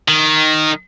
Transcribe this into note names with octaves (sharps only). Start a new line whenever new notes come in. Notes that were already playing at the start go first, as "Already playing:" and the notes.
D#3